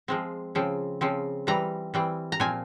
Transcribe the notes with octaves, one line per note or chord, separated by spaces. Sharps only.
F3 G#3 C4
C#3 F3 C4
C#3 F3 C4
E3 G3 C4 A#5
E3 G3 C4
A#5
A#2 F3 C4 G#5